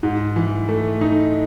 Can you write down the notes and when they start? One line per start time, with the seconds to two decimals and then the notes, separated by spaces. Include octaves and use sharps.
0.03 G#2
0.36 E3
0.69 A3
1.01 D#4